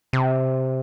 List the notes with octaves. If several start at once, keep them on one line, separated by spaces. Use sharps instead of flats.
C3